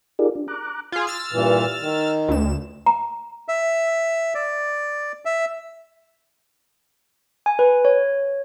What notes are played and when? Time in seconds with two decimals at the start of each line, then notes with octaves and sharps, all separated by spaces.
0.19 D#4 F4 G4 G#4 A#4 D5
0.35 D4
0.48 A#5 D6 F#6
0.92 F4 G#4
1.07 E6 F6 A6
1.32 G2 A#2 E3
1.81 D#3
2.28 D2 E7
2.86 A#5
3.48 E5
4.35 D5
5.25 E5
7.46 G#5
7.59 B4
7.85 C#5